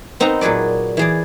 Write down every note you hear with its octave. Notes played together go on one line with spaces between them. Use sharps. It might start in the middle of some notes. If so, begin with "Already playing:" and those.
B3 C4 D#4 B4 F#5 A#5
A#2 F#3 G#4 B4 D5
E3 G#4 D5